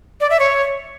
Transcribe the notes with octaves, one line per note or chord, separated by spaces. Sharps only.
D5
E5
C#5